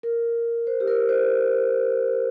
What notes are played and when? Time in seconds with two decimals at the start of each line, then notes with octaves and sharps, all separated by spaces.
0.03 A#4
0.67 C5
0.80 G4
0.88 A#4
1.09 C5